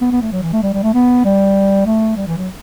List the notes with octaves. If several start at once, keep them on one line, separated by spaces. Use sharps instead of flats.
B3
B3
A3
F#3
E3
A3
G3
G3
A3
B3
G3
A3
G3
E3
F#3